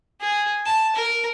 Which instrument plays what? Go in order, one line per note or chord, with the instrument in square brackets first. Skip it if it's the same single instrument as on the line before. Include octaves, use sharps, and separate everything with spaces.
[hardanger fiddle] G#4
A5
A#4